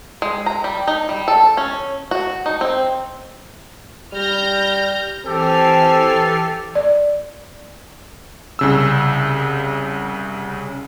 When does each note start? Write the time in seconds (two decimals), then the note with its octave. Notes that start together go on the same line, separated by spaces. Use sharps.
0.22 G#3
0.46 A#5
0.64 G3
0.88 D#4
1.09 G3
1.28 A4
1.57 C#4
2.11 F#4
2.46 D#4
2.61 C4
4.13 G3 F6 G6 A#6
5.25 E3 C4 G4 A4 G#5 F6 C7
6.75 D5
8.59 C2 C#3 E6